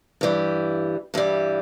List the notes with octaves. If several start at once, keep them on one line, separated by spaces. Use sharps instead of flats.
G2 E3 G3
G2 E3 G3